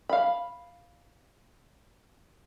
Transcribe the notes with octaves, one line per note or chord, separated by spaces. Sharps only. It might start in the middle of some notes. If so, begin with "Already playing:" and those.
F5 B5